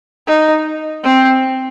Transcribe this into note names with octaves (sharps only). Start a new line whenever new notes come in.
D#4
C4